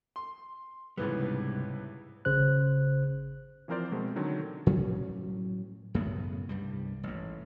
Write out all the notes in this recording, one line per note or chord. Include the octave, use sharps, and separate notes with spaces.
C6
C#2 G#2 C3 E3 G3 B3
G#1 C#3 C5 F#6
E3 F3 C4 A#4 C5 D5
B2 G#3 A3 C4
D3 D#3 F#3
A2 F#3 G3 C#4
F#2 A2 C#3 B3
C2 G2 G3
A1 G#2